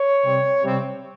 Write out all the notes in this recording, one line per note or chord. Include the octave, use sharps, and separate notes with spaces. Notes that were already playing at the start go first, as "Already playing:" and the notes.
Already playing: C#5
C3 G3 C4
C3 G3 C4